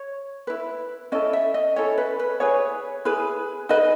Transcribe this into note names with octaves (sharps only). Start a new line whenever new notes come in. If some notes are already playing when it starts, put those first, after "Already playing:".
Already playing: C#5
E4 B4
C#4 E4 A4 D#5
E5
D#5
C#4 E4 A4 C#5
B4
B4
E4 G#4 B4 C#5
E4 G#4 B4
D#4 G#4 B4 D#5